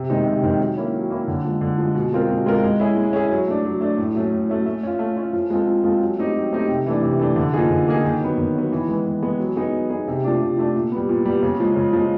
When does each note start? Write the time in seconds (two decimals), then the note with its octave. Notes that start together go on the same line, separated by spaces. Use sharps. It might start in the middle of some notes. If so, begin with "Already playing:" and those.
Already playing: C3
0.10 D#3 G#3 C4 D#4
0.26 C3
0.43 D#3 G#3 C4 D#4
0.60 F#3
0.77 A#3 C#4 E4
0.94 F#3
1.10 A#3 C#4 E4
1.28 D3
1.45 F3 G#3
1.61 D3
1.78 F3 G#3
1.95 B2
2.13 G#3 C4 F4 A#4
2.29 B2
2.46 G#3 C4 F4 A#4
2.63 G#3
2.80 C#4 E4 G#4
2.97 G#3
3.13 C#4 E4 G#4
3.30 F#3
3.47 A3 D4
3.65 F#3
3.81 A3 D4
3.98 A2
4.15 F#3 A3 C#4
4.33 A2
4.50 F#3 A3 C#4
4.66 A3
4.83 C#4 F4
4.99 A3
5.17 C#4 F4
5.33 F3
5.50 G#3 C4 F4 A4
5.67 F3
5.84 G#3 C4 F4 A4
6.01 F#3
6.18 A3 C4 D#4 G4
6.34 F#3
6.52 A3 C4 D#4 G4
6.69 C3
6.86 E3 A3 D4
7.03 C3
7.19 E3 A3 D4
7.36 D3
7.53 F3 A#3 D#4 G#4
7.70 D3
7.88 F3 A#3 D#4 G#4
8.04 D#3
8.20 F#3 B3
8.38 D#3
8.55 F#3 B3
8.72 E3
8.88 G#3 B3
9.06 E3
9.22 G#3 B3
9.40 F#3
9.56 B3 D#4 G#4
9.73 F#3
9.90 B3 D#4 G#4
10.08 C3
10.24 F3 A3 D4
10.41 C3
10.57 F3 A3 D4
10.75 A#2
10.92 G3 B3
11.09 A#2
11.25 G3 B3
11.43 C#3
11.60 F3 G#3
11.76 C#3
11.93 F3 G#3